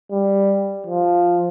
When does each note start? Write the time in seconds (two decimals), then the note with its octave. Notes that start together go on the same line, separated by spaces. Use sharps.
0.11 G3
0.87 F3